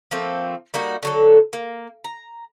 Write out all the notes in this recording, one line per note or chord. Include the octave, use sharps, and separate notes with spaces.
F3 A3 A#3 C4
G3 A#3 D#4 F#4
D3 F#3 A4
A#3
A#5